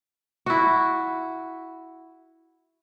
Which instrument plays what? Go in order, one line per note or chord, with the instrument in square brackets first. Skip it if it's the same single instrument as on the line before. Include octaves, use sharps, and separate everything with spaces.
[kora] E4 F#4